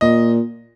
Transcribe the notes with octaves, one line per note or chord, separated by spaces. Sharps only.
A#2 D#5